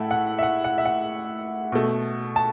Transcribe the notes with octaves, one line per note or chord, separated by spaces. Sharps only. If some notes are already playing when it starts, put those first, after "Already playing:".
Already playing: A2 A3 E5 F#5 A5
F#5
E5
F#5
F#5
E5
F#5
B2 A3
A5